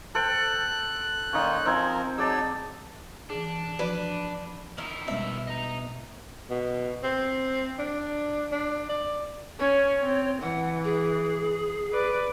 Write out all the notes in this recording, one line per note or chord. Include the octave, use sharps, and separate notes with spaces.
A4 C5 G5 F#6
A#2 D#3 C#4 D#4 F4
F3 C4 D#4 A#4 G#5
F#3 D#4 G#4 D5 A5 E6
E3 D4 G#4
F3 F#4 B4 D5
D#3 E4 A#4
B2 G3 G#3 C#4 E5
D#5 A#5
B2
C4
D4
D4
D5
C#4 C#5
C4
E3 F#5
G#4
B4 D5